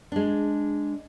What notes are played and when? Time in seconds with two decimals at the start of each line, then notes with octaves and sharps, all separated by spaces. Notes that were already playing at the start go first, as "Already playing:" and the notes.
0.12 G#3 D4